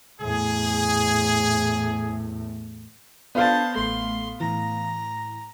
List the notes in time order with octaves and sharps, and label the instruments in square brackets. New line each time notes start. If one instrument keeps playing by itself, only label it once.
[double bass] E2 A2 [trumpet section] G#4
[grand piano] B3 F5 [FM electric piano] D4 F4 A4 [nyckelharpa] C5 A5
[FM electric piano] A1 A3 [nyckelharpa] C6
[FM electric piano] A2 E3 [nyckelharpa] A#5